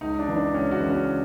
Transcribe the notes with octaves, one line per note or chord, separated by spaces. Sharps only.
C#2 D#4
D4
C#3 E3
D4
C#2 C#4
F#4
C#3 E3
C#4